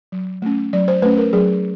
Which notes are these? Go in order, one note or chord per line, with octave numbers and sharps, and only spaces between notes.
F#3
A3 C#4
F#3 D5
C5
A3 C#4 B4
A#4
F#3 G#4